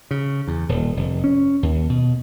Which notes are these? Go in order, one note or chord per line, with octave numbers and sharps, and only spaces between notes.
C#3
E2
D#1
F1
C#4
D#2
B2